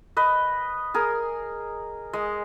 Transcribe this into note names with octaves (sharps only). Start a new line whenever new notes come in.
B4 D#5
G#4 A#4
G#3